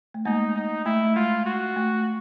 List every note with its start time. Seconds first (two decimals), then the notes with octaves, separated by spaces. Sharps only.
0.14 A3
0.25 G#3 A#3 D#4
0.55 D#4
0.85 A3 E4
1.04 A3
1.16 G#3 F4
1.46 F#4
1.76 A3